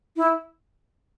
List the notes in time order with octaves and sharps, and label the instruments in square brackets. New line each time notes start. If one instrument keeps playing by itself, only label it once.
[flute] E4